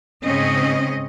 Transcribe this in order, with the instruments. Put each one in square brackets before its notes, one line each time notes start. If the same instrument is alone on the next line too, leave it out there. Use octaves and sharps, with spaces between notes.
[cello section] G#2 C#3 C4 C#4 D#5